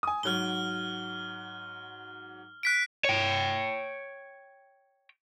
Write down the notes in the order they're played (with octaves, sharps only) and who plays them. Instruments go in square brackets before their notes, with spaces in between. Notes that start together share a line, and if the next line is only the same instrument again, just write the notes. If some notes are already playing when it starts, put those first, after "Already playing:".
[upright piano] G#5 D#6
[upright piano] G#2 F#3 [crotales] F6 G7
[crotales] F#6 B6 D7
[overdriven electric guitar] C#5 G5